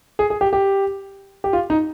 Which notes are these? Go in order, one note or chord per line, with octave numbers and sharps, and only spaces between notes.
G#4
G#4
G4
G4
G4
F4
D#4